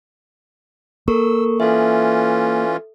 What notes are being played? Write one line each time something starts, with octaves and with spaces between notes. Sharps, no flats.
A#3 A4 A#4 C#6 E6
E3 C#4 F4 A4 E5